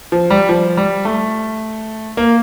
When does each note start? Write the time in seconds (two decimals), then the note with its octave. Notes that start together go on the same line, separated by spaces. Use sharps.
0.12 F3
0.30 G3
0.49 F3
0.77 G3
1.05 A3
2.17 A#3